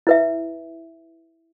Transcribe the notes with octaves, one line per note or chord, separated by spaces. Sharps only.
E4 B4 E5